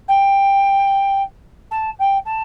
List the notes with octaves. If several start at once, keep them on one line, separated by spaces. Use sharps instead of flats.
G5
A5
G5
A5